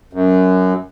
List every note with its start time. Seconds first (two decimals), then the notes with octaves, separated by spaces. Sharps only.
0.13 F#2